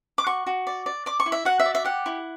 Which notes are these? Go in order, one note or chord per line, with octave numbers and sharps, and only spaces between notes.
D6
F#4 C#6
F#4
D5
D5
D5 D6
C#6
E4
E5
F#4 F#5
E5
D5
E5
G4 F#5
E4